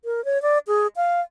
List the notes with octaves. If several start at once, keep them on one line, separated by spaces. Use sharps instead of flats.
A#4
C#5
D5
G#4
F5